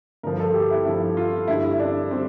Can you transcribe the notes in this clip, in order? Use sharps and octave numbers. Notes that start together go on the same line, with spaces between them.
G2 D3 F3 A#4
A4
G4
E4
G2 D3 F3 E4
F4
G2 D3 G3 E4
E4
D4
D3 G3 C4